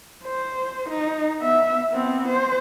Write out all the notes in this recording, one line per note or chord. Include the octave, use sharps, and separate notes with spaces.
C5
D#4
B3 E5
B3 C4
C5